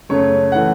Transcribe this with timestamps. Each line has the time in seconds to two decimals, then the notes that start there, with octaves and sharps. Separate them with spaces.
0.09 F#2 C#3 A3 C#5
0.52 E3 A3 F#5